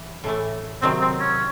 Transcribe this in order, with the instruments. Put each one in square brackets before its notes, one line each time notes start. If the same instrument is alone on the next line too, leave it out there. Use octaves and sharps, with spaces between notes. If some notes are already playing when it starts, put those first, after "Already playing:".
Already playing: [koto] E3
A2 E3 A3
[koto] C3 D#3 F#3 [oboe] C4
[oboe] C4
C#4